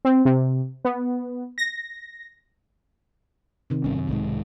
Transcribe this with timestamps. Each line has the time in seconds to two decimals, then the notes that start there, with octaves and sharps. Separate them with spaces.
0.05 C4
0.25 C3
0.85 B3
1.58 A#6
3.70 C3 D#3
3.84 G#1 G2 C#4
3.96 F#2
4.09 B1 G#2 G#3